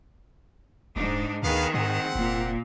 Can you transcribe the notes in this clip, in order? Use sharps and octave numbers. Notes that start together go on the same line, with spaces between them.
D#1 G#2 D4 D#4
D2 D#3 B3 G#4 B4 F5
G#2 C4 F#5
F1 A#2